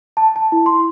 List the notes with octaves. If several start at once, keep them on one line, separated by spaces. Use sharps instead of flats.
A5
A5
E4
C6